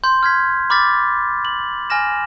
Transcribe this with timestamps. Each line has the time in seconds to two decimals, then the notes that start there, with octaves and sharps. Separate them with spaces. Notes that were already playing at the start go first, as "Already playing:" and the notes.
0.04 C6 G6
0.23 F6 G#6 B6
0.70 B5 D6 F6 G6 A6 B6
1.45 F#7
1.90 G#5 F6 A#6 E7